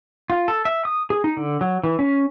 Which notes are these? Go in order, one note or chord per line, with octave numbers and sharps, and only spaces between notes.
F4
A4
E5
D#6
G#4
D#4
D3
F#3
E3
C#4